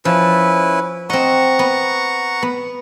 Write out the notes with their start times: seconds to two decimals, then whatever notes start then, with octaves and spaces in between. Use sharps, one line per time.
0.05 F3 C#4 E4 B4
1.10 C4 D#5 F#5 A#5 C#6
1.59 B3
2.42 B3